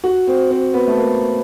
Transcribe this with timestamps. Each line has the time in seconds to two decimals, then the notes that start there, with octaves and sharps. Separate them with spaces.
0.04 F#4
0.27 C4
0.51 C4
0.74 B3
0.88 A3
0.98 A#3